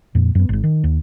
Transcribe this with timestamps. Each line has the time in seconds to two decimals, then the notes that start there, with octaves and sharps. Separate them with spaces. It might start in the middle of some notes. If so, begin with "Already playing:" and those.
0.15 F2 A#2
0.35 F#2 B3
0.49 G#1 G#2
0.64 D#3
0.84 D#2